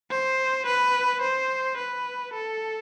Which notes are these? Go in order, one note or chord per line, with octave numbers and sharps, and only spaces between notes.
C5
B4
C5
B4
A4